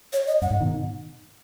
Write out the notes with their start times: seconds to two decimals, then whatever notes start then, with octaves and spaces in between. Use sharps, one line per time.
0.13 C#5
0.27 D#5
0.42 F#2 F#5
0.51 G#2
0.61 B2 D#3